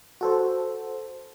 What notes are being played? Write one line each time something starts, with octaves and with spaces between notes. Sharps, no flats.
F#4 A4 C5